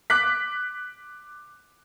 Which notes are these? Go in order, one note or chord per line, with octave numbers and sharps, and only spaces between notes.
D6 F#6 B6